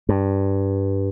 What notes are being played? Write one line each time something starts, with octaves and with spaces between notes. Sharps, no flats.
G2